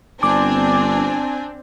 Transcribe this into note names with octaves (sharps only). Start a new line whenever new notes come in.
G1 C4 D4 G#5 D6